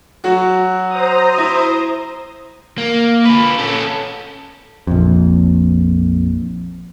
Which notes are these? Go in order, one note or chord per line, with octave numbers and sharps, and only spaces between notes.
F#3 F#4
C5 A#5 D#6
E4
A#3
F4 B4
C#4 A4
A#1 F2